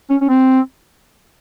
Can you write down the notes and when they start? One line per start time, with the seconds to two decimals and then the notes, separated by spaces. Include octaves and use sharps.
0.10 C#4
0.21 C#4
0.29 C4